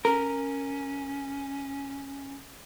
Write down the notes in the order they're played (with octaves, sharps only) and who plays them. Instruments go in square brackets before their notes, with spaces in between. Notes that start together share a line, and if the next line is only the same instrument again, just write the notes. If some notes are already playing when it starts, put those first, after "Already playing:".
[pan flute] C#4 [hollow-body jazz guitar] A#4